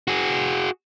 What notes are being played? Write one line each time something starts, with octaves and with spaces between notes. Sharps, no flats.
F#4 G#4